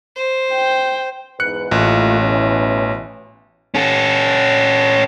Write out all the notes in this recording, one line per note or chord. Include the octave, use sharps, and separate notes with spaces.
C5
G5
E2 G#2 B4 F#6 C#7
A1 A3 A#3 F4
B2 E3 C#4
C#4 A4